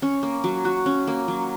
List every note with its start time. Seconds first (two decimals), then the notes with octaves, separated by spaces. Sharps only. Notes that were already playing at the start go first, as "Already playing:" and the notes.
0.02 C#4
0.23 A#3
0.44 F#3
0.65 F#4
0.86 C#4
1.07 A#3
1.28 F#3